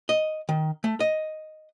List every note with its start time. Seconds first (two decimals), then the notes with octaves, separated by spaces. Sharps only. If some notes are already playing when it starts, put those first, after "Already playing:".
0.09 D#5
0.49 D#3
0.84 A3
1.00 D#5